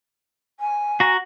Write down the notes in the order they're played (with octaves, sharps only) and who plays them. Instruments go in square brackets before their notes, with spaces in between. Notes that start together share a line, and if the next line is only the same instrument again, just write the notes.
[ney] G#5
[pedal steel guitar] F#4 A#5